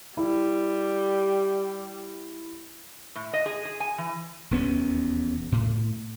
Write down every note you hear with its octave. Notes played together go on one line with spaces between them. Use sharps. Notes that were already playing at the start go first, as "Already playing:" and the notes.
G3 E4
A2
D#5
G#4
G#4
G#5
E3
E1 D#2 B3 C#4
A2